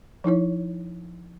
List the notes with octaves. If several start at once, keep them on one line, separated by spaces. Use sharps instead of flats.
F3 D#4 E4 C#5